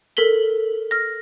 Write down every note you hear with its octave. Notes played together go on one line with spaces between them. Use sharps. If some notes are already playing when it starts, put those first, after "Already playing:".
A4 A#4 B6 F#7 G7
F6 A#6